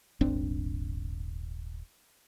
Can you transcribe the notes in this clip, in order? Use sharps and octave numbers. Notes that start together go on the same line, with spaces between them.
D#1 G#1 C4 D4